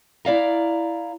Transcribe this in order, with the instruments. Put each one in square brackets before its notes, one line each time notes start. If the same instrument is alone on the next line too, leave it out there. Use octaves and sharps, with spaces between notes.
[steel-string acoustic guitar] E4 D5 F5 A#5